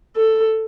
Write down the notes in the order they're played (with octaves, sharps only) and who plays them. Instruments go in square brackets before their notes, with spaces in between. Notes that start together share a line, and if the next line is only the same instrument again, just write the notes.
[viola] A4